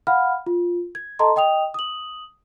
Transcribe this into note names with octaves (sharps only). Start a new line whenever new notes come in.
F5 F#5 B5 F6
F4
G#6
A4 D#5 A5 A#5 C6
D#5 G5 D#6 F7
D#6 F#7